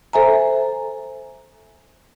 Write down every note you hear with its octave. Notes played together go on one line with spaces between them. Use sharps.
A4 C5 E5 G#5 A#5